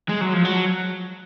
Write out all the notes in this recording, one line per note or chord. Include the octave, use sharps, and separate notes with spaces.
G#3
F#3
F3
F#3